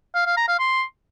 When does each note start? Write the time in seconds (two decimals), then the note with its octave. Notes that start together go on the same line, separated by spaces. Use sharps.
0.15 F5
0.26 F5
0.37 A#5
0.48 F5
0.59 C6